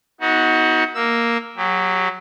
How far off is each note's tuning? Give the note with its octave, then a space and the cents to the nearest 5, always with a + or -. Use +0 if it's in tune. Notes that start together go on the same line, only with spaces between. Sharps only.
B3 +0 D#4 +30 F#4 +0
A#3 +0 E6 +0
F#3 +0 G4 +35